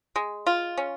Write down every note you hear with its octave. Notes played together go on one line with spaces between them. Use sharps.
G#3
F4
C#4